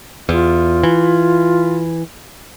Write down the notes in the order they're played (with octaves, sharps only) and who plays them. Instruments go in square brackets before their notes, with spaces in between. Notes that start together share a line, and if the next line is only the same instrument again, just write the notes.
[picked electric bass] E2 [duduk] F4
[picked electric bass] E3